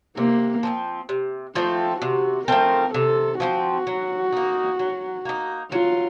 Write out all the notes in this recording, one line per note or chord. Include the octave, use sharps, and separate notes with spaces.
C3 A#3
F3 A3 C4
C3
F3 A3 C4 F4
C3 F#4
F3 A3 C4 A#4
C3 A4
F3 A3 C4 F#4
F#3
A#3 D#4
F#3
A#3 D#4
F#3 F4